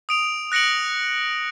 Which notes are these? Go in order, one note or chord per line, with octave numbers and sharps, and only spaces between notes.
D#6 D7 F7
F#6 A#6 C#7 D7 F#7